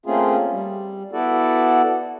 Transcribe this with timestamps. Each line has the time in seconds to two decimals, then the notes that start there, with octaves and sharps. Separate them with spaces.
0.06 A3 A#3 C4 C#4 F4 G#4
0.51 G3
1.12 B3 E4 F#4 A4 D5